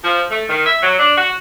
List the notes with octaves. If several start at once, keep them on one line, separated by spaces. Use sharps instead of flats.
F3
A3
D#3
E5
F#3
D4
F#4